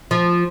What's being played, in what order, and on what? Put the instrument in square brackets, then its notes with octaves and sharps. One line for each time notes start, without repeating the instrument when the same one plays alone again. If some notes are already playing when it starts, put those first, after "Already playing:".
[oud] F3